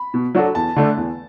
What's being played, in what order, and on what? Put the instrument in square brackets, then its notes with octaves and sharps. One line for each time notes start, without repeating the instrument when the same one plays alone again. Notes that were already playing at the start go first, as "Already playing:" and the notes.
Already playing: [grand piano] B5
[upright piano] B2
F#3 D4 F#4 A4
[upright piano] E2 [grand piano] A5
[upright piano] D3 A3 D4
E2